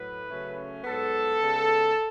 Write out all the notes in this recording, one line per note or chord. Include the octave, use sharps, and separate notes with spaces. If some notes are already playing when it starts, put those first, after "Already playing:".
Already playing: A2 F#3 A3 B4
C#3 F#3 A3 C#4
G#2 F#3 B3 A4
C#3 G#3 B3